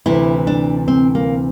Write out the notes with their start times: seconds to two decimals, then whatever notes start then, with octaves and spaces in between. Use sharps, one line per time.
0.06 D2 C3 E3 E4
0.47 D4
0.88 C4
1.15 A#3